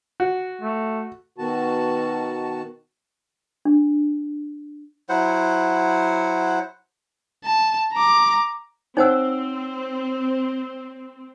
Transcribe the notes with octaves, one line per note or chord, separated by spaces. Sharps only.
F#4
A3
B2 D#3 F#4 A5
D4
F#3 E4 C5 F#5
A5
A#5 D6
C4 D#4 C5 C#5 F#5 G5 E6